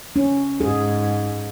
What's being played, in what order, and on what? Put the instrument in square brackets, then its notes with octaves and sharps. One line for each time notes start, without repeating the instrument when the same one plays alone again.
[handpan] C#4
[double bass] G#2 [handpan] G#4